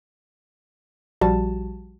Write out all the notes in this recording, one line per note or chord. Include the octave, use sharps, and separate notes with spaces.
A#1 F3 G3 F#4 A5